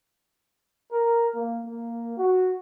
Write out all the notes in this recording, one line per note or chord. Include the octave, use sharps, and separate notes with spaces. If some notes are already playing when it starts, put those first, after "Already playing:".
A#4
A#3
A#3
F#4